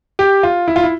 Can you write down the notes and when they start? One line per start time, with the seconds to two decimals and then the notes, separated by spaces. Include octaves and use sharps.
0.19 G4
0.43 F4
0.68 E4
0.76 F4
0.83 E4